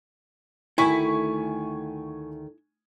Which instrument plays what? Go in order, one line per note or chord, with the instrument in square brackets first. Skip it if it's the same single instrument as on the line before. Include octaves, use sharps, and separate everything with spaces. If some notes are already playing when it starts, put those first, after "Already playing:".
[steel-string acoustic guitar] D2 D#3 A3 [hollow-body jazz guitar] E4 [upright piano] G#5 C#6 B6